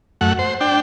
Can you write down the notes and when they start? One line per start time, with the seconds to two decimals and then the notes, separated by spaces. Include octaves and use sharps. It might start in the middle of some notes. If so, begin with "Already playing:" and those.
0.21 F#2 A3 F#5
0.39 C5
0.61 D4 G5